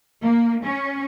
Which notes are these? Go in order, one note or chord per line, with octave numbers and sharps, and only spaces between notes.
A#3
C#4